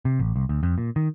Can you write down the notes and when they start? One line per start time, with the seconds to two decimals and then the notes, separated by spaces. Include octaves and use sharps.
0.05 C3
0.19 A1
0.36 C2
0.49 D2
0.63 F2
0.78 A#2
0.96 D#3